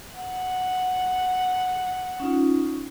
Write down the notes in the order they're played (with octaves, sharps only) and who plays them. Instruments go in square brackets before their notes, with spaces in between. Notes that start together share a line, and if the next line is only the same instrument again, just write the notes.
[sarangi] F#5
[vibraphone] C#4 D#4 F4